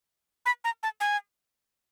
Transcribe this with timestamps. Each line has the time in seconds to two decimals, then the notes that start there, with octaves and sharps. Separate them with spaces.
0.46 B5
0.64 A#5
0.83 A5
1.00 G#5